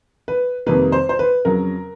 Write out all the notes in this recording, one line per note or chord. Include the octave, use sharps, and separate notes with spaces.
B4
F2 C3 D#3 G3 A#3 B4
C5
C5
B4
F2 C#3 F#3 A#4